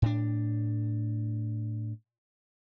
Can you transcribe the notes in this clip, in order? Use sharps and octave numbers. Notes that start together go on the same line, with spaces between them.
A2 D4